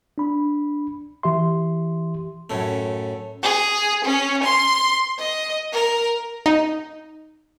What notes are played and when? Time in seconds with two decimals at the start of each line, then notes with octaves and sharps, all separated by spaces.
0.18 D4 B5
1.23 E3 G4 E5 C6
2.50 F#2 A2 A3
3.43 G#4
4.05 C#4
4.44 C6
5.19 D#5
5.73 A#4
6.46 D#4